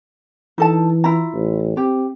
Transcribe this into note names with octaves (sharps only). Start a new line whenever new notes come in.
E3 D#4 A4 A5
E4 F4 A#5
A1
C4 G4